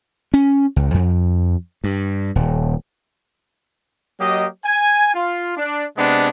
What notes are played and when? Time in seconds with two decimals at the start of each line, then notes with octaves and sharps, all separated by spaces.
0.34 C#4
0.76 C#2
0.94 F2
1.84 G2
2.35 D#1
4.19 F#3 A#3 G4 D#5
4.63 G#5
5.13 F4
5.56 D4
5.96 C3 G#3 B3 D4